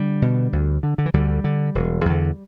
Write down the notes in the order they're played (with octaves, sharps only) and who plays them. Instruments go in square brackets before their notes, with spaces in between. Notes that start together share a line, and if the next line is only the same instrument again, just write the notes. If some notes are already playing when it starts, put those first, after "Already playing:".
Already playing: [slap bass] D3 G3
B2
D2
D3
D3
E3
D2 D3 G3
D3
E1
E2 D3